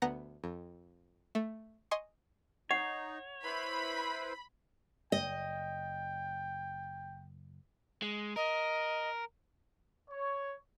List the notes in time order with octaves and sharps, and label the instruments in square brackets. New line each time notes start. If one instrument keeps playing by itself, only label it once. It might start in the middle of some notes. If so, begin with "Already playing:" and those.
[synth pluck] D2 B3 F#5 A#5 A#6
F2
A3
D#5 G#5 C6 C#6
[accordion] D#4 [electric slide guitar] C#5 [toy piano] F#5
[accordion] E4 B4 C5 [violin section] B5
[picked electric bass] F#1 [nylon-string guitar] D#5 [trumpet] G5
[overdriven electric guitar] G#3
[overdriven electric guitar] A#4 [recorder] D#5
[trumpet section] C#5